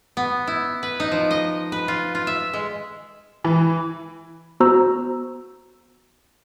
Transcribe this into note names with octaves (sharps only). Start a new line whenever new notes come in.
B3
E4
B4
D#4
F3
D#5
B4
F4
F4
E5
G#3
E3
B3 F#4 C5 A#5 E6